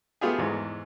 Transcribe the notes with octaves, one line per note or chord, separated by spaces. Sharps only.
A3 B3 F4 G4 G#4
E2 G#2